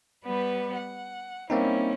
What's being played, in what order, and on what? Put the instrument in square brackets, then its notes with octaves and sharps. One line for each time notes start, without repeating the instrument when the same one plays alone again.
[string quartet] G3 B3 B4
F#5
[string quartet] G3 C#4 E4 [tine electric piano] A#3 C4 D#4